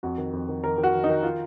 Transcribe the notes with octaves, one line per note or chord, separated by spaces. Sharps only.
F2 F#4
D#3
F2
D#3
D#3 A#4
D#3
F#4
D#3
D#4
D#3
F4